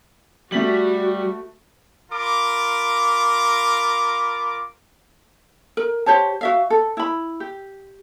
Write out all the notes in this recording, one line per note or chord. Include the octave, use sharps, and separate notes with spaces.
G3 A3 F#4 B6 F#7
F4 A#4 B5 D6
A#4
G4 C5 C#5 A5
F#4 E5 F5
A4
E4 B5
G4